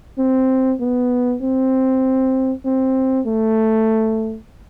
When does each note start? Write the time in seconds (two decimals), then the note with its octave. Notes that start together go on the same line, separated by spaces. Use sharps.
0.18 C4
0.80 B3
1.42 C4
2.65 C4
3.26 A3